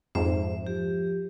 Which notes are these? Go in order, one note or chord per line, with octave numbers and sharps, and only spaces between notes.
F2 G#2 C5 E5
F3 G4